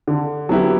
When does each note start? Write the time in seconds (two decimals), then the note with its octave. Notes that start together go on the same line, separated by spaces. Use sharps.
0.07 D3
0.49 F#3 B3 E4 G4